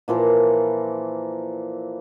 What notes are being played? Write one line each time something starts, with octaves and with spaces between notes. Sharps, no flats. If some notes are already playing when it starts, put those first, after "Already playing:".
A#2 E3 F3 A#4